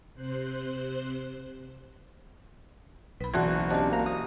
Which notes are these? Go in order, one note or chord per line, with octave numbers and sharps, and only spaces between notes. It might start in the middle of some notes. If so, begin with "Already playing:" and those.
C3 C5 F#6
B1 B4 B5
F#1 E3 F#4 D5 A5
C4 D4 G4 D#5 A5
A#3 A#5
D#6